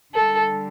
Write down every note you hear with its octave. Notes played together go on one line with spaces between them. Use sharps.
D3 G3 A4